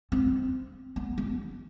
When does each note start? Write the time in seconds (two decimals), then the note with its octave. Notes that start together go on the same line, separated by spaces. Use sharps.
0.12 C4
0.96 B3
1.18 B3